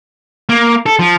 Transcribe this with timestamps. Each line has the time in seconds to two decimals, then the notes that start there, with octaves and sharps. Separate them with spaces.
0.49 A#3
0.86 A4
0.99 F3